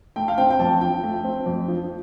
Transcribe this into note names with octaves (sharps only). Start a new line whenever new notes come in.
A3 G5
F5
C4 G5
G5
F2 A5
F3 G5
A3
C4
F2
F3